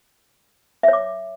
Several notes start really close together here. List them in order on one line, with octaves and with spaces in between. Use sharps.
E5 C#5 D6